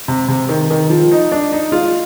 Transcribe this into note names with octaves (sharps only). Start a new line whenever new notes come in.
C3
C3
D#3
D#3
F3
D#4
D4
D#4
F4